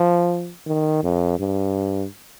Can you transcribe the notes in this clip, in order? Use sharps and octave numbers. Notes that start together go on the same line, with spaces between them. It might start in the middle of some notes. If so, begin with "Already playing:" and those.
Already playing: F3
D#3
F2
G2